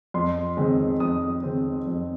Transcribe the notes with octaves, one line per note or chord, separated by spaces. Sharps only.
F2 C6
D#3 G#3 C4
F2 D#6
D#3 G#3 C4
F2